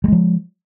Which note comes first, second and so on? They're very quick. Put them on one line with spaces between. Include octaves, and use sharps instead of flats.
G3 G#3 F3